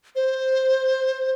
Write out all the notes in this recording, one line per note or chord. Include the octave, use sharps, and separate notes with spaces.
C5